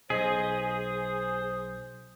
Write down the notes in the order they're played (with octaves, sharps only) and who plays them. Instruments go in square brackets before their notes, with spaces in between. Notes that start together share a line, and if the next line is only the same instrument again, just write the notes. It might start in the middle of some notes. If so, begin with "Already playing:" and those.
[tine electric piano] B1 B6 [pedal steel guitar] G#4 [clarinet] C5 [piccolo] D#5
[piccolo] D#6